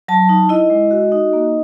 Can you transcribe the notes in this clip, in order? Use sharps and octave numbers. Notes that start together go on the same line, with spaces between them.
F#3 A5
D#4
E4 D#5
G#3
F#4
D#4
A#3